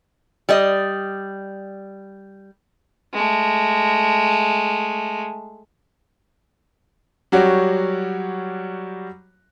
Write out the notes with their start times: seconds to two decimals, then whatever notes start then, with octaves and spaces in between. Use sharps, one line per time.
0.49 G3 D5 D#5
3.13 G#3 A3
7.32 F#3 G3 F#4 G4 C#5